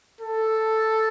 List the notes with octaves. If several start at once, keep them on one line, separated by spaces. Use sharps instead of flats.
A4